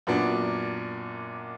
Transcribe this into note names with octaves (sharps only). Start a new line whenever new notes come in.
F#2 A#2 B3 D4